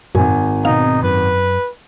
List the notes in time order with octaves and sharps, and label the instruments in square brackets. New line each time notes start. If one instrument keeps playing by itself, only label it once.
[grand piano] G#1 G#5 [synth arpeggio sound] F#2 A#2
[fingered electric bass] B2 C4 [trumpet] D#4 [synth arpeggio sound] F5
[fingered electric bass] F#2 [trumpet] B4